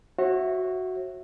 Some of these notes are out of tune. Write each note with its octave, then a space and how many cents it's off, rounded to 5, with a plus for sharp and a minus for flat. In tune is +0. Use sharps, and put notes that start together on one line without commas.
F#4 +0 C#5 -45 E5 +0